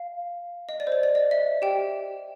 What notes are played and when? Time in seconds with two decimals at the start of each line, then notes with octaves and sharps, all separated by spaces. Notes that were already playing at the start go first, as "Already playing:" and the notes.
Already playing: F5
0.69 D#5
0.80 D5
0.87 C5
0.92 C#5
1.03 D5
1.15 D#5
1.31 E5
1.62 G4 G5